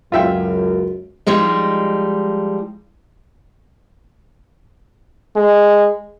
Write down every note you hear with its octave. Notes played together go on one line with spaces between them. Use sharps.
C#2 F#2 F4 E5 G5
F3 G3 G#3 D#4
G#3